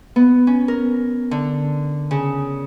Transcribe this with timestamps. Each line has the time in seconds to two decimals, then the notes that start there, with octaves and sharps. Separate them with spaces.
0.16 B3
0.47 C#4
0.68 A#4
1.31 D3
2.11 C#3